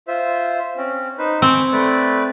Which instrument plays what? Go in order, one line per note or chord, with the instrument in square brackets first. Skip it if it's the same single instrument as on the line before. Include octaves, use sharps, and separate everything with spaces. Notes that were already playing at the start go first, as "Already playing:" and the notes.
[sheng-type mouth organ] F4 C5 E5
C4 C#4
D#4 B4 C5
[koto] C4 [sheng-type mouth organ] G#5 C#6 D6
[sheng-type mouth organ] A3 B4 D5